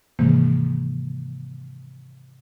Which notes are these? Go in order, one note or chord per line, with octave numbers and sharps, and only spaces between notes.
G#2 C3 D#3 E3 G#3 A#3